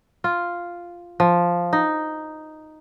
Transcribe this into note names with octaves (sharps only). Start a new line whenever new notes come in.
F4
F3
D#4